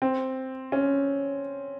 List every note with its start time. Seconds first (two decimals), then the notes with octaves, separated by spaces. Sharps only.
0.02 C4
0.72 C#4